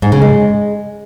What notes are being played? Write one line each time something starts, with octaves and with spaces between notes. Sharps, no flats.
G#2
C#3
G#3